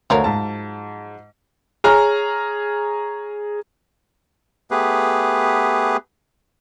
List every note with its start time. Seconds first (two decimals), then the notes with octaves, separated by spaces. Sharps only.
0.10 D2 F3 F#3 A3 A#4 C#5
0.24 G#2 A5
1.84 G#4 C#5 A#5 F6
4.71 A3 B3 G4 G#4 B4